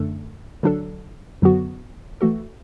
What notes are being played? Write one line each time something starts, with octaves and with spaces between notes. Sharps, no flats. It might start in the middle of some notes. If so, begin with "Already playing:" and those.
Already playing: F#2 D3 A3 D4 A4
D3 F#3 D4 A4
F#2 D3 F#3 B3 F#4
E3 A3 F#4 A4